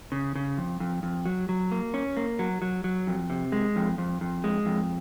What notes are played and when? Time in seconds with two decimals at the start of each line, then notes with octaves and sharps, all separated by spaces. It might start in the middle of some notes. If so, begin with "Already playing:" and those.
0.12 C#3
0.35 C#3
0.58 F2
0.80 F2
1.03 F2
1.25 F#3
1.49 F#3
1.72 A#3
1.94 C#4
2.17 A#3
2.39 F#3
2.62 F#3
2.84 F#3
3.07 F2
3.30 C3
3.52 G#3
3.76 F2
3.98 F2
4.21 F2
4.44 G#3
4.66 F2